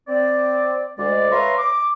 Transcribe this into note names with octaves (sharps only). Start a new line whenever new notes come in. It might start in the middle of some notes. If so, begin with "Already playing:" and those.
C4 D5
D2 G#3 D5
B4 C#5 E5 F5 A#5 C6
D6